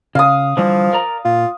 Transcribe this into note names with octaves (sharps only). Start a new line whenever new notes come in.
C#3 F5 D#6
D3 E3 F3 G3
A#4 D5 A#5
A#2 F4